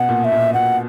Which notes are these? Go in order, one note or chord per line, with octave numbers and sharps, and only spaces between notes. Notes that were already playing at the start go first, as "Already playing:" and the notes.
Already playing: B2 F#5
A#2
E5
A#2
A#2 F#5